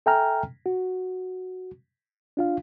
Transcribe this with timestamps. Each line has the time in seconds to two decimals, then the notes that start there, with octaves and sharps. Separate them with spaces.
0.06 A4 E5 G5 G#5 A#5 F6
0.66 F#4
2.37 D4 F4 F5